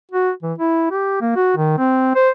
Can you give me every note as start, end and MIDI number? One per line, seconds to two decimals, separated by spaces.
0.11 0.31 66
0.43 0.53 52
0.58 0.86 64
0.91 1.20 67
1.21 1.32 58
1.36 1.56 66
1.56 1.76 51
1.78 2.11 60
2.15 2.30 72